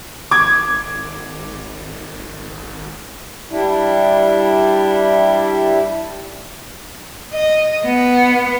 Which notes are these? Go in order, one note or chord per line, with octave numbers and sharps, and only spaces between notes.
G#1 D6 G#6
G3 D4 E4
D#5
B3